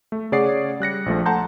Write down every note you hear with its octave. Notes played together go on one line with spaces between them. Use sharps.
A3
C#3 G#4 C#5 D5 F#5 C7
G3 F#6 A#6 C#7
A#1 F3 A3
A4 F#5 A5 A#5 C6 G6